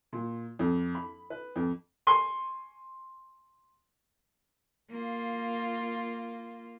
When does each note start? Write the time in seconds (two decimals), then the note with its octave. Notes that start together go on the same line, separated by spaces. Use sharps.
0.13 A#2
0.59 F2
0.95 B5
1.30 B4
1.56 F2
2.07 G#5 C6 C#6
4.90 A#3 F4